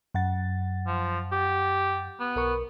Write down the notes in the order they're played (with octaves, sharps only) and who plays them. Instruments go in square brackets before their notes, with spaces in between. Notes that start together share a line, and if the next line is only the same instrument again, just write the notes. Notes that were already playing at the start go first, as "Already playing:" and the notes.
[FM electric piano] F#2 F#5 A6
[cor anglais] F3
G4
B3
[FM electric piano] B1 A#4 C#6